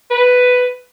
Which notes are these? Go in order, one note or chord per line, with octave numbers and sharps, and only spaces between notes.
B4